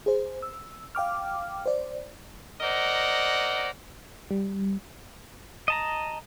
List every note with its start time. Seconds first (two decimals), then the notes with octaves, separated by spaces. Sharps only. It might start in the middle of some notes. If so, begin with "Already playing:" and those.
0.06 G#4 C5
0.42 E6
0.95 F5 G5 D6 F6
1.66 C5 D5
2.61 A#4 C5 D5 D#5 F#5 A#5
4.31 G3
5.68 D#5 A5 A#5